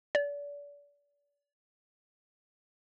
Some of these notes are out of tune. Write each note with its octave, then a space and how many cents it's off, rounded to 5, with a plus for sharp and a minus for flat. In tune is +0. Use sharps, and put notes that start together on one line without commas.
D5 -35